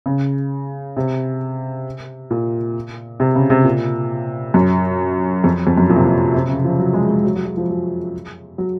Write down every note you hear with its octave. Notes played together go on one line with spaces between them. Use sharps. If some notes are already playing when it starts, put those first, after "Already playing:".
C#3
C3
A#2
C3
C#3
C3
A#2
F#2
F2
F2
F#2
A#2
C3
A#2
C3
C#3
F3
F#3
G#3
G#3
F#3
F#3
F#3
F3
F#3
F#3